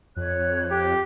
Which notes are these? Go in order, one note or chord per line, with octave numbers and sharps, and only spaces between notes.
F2 C#5 F#6
G4